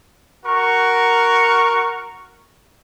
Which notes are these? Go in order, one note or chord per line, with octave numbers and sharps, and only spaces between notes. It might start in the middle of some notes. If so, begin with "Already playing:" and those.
F#4 A#4 C#6